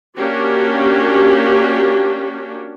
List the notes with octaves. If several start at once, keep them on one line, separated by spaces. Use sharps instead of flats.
A#3 C#4 D4 F#4 G4